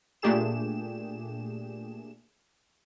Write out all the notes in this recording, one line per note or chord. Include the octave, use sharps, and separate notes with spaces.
A#2 A3 D4 G4 G#4 E7